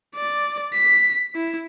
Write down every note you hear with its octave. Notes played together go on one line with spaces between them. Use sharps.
D5
B6
E4